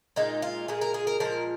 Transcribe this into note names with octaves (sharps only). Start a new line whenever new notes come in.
A#2 G#3 D#4
F4
A#2 G#3 G#4
A#4
G#4
A#4
A#2 F3 G#3 A#4